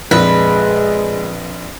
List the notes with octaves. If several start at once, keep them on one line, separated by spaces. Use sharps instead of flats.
A#1 F2 G#3 B4